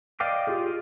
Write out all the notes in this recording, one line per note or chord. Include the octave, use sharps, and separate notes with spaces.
D5 D#5 F5 G5 D6
F4 G4 G#4